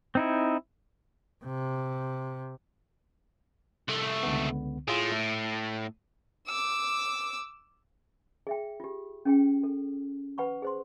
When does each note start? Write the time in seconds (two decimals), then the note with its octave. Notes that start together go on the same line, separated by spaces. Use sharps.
0.15 C4 D#4 E4
1.44 C3
3.88 C2 A3
4.23 C#2 D3 B3
4.88 A2 F4 G#4
5.12 A3
6.47 D6 E6
8.47 G#4 E5 G5
8.80 F4 G4
9.25 C#4 G#4 G5
9.63 A4
10.38 B4 F#5 B5 C#6
10.62 G#4 C5 C6